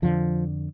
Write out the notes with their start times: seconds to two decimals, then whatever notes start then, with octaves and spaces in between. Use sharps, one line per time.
0.02 F2 D3 F3